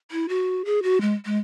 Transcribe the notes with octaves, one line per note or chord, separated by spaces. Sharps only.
E4
F#4
G#4
F#4
G#3
G#3